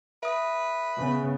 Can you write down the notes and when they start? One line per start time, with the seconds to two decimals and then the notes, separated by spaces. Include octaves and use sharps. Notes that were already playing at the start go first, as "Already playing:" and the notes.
0.23 B4 E5 D#6
0.99 C#3 B3